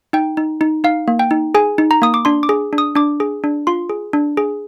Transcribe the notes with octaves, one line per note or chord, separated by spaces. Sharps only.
D#4 G5
D#4
D#4
D#4 F5
A#3
G5
D#4
G#4 G#5
D#4
A#5
A#3 D#6
D6
D4 C6
D6
G#4
D4
D#6
D4 D6
G#4
D4
F4 C6
G#4
D4
G#4